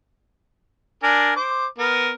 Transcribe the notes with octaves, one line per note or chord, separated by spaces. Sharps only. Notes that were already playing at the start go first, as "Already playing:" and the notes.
D4 A#4 G#5
C5 D6
B3 A#4